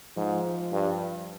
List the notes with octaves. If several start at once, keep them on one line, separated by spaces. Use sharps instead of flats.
G#2 F3
G2